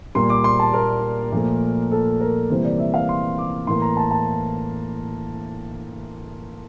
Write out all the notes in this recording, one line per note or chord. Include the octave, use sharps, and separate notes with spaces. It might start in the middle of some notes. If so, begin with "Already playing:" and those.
A#2 G3 A#3 C6
D6
C6
A5
A#4
A#2 F3 A3
A4
A#4
C3 E3 G3 A#3 C5
D5
E5
F5
C6
D6
A2 E3 A#3 C6
A#5
A5
A5